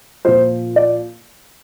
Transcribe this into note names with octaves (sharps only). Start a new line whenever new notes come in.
A#2 F3 C5
D5